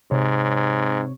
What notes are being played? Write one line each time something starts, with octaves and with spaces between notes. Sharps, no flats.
G#2 C3 C#5